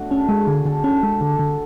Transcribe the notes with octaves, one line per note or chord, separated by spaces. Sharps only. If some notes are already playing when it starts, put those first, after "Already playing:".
Already playing: A3 D4 F#4
C#4 A4
G#3 G#4
D3 G#4
D3 A4
C#4 A4
G#3
D3 A4
D3